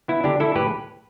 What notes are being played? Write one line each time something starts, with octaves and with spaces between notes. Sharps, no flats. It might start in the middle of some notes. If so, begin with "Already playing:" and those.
B3 E4
D3 D4 G4
D3 E4 A4
A2 G4 B4